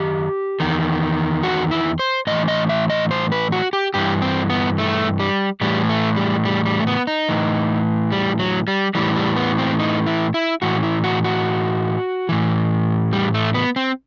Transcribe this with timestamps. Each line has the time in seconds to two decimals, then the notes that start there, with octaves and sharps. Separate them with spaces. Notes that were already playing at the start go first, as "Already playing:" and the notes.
Already playing: F#2 D#3 G4
0.60 E2 D#3
1.43 F#4
1.71 E4
1.99 C5
2.27 A2 E3 D#5
2.48 D#5
2.69 E5
2.90 D#5
3.11 C5
3.32 B4
3.52 F#4
3.73 G4
3.94 G2 E3 G4
4.22 C4
4.50 B3
4.78 A3
5.20 G3
5.61 A2 E3 G3
5.89 A3
6.16 G3
6.45 G3
6.66 G3
6.80 A3
6.87 B3
7.07 D#4
7.29 A2 E3
8.12 G3
8.39 F#3
8.68 G3
8.95 A2 E3 G3
9.16 G3
9.36 B3
9.58 C4
9.79 D#4
10.06 E4
10.34 E4
10.62 A2 E3 F#4
10.83 E4
11.04 F#4
11.24 F#4
12.29 A2 E3
13.13 G3
13.34 A3
13.54 B3
13.76 C4